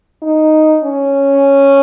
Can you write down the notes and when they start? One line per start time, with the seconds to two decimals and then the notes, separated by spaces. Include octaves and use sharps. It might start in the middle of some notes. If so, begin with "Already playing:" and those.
0.22 D#4
0.84 C#4